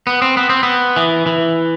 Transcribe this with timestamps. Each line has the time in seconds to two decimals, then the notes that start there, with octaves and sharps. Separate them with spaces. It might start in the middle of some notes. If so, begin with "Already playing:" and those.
0.07 B3
0.22 C4
0.37 B3
0.50 C4
0.63 B3
0.96 E3
1.27 E3